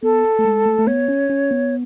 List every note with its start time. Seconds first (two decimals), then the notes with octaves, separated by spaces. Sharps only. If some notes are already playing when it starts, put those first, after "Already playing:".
0.03 B3 A4
0.39 A3
0.45 G#3
0.66 A3
0.79 A3
0.87 B3 C#5
1.08 C#4
1.30 C#4
1.51 B3